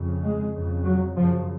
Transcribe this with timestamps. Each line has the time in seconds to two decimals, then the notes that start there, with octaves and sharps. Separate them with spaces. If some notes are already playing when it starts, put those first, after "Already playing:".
Already playing: F2 C#3
0.22 G#3
0.53 F2 C#3
0.84 F#3
1.15 F#2 C#3 F3